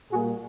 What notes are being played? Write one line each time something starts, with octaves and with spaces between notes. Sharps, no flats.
A#2 G3 A#3 F#4 G#4